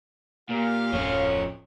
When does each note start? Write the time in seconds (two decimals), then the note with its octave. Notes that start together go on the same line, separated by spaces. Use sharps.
0.49 A#2 G4 F5
0.92 D1 F2 F3 C#4 C#5